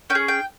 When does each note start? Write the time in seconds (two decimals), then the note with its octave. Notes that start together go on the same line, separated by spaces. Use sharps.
0.10 C#4 G5
0.15 G#4
0.28 G5